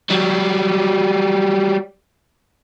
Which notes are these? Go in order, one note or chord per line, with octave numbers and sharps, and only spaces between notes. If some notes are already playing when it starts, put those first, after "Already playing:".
F#3 G3